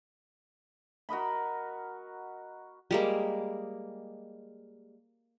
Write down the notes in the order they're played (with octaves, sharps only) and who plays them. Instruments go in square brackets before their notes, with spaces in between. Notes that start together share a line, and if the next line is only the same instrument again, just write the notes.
[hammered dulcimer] F#4 A#4 D#5 B5
[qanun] G3 G#3 A#3